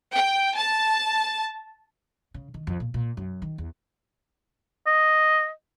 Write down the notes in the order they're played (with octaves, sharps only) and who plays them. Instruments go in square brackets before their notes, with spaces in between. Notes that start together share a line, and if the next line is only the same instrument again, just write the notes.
[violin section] G5
A5
[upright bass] C#3
D#3
F2
A#2
A#2
F#2
D#3
E2
[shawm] D#5